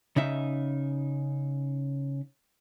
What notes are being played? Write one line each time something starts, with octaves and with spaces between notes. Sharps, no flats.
C#3 D#4 E5